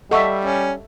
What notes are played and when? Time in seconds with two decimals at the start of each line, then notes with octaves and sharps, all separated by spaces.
0.11 G3 A4 D#5 E5 F#5 C#6
0.45 C#4